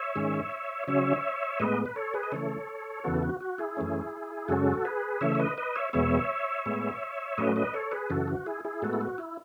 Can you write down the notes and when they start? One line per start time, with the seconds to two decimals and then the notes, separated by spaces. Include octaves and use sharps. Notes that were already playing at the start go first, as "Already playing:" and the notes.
Already playing: C#5 E5
0.15 G#2 D#3 G#3 C#4
0.87 C#3 F#3 C#4 C#5 E5
1.60 A2 G#3 B3 B4 D#5
1.86 B4
1.96 A4 C#5
2.14 G#4 B4
2.23 D#5
2.32 C#3 E3 A3 A4 C#5
3.04 E2 C#3 E3 B3 F#4 A4
3.22 F#4
3.41 F#4
3.58 E4 G#4
3.77 F#2 E3 A3 C#4
4.48 F#2 C#3 G#3 C#4 F#4 A4
4.85 G#4 B4
5.21 C#3 E3 A3 C#5 E5
5.35 C#5
5.39 B4 D#5
5.58 B4 D#5
5.75 C#5 E5
5.93 E2 B2 G#3 B3 C#5 E5
6.66 A2 G#3 B3
7.38 A2 F#3 A3 C#4 B4 D#5
7.56 B4 D#5
7.74 A4 C#5
7.92 G#4 B4
8.10 F#2 C#3 E3 F#4 A4
8.28 F#4
8.46 E4 G#4
8.65 E4 G#4
8.82 A2 G#3 B3 F#4 A4
8.93 E4
9.01 F#4
9.18 E4